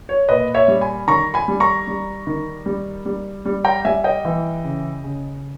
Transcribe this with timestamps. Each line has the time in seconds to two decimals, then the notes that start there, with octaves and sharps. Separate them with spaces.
0.09 C#5
0.28 A#2 B4 D#5
0.54 C#5 E5
0.68 G3
0.81 G#5 B5
1.08 D#3 A#5 C#6
1.34 G#5 B5
1.48 G3
1.60 A#5 C#6
1.87 G3
2.27 D#3
2.66 G3
3.06 G3
3.45 G3
3.65 G5 A#5
3.85 G3 E5 G#5
4.04 D#5 G5
4.25 E3
4.64 C#3
5.04 C#3